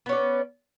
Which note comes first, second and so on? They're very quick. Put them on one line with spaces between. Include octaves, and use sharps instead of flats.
B3 C#4 D5